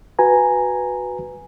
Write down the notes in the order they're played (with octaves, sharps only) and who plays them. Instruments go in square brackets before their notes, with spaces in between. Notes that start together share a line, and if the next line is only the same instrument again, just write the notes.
[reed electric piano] F#4 B4 G#5 A#5